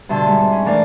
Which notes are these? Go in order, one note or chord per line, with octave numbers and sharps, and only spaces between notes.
G2 B2 D3 E5 A5 C6
G#2 G3
C4
C#4
A2 E3 D4 A#4 D5 F5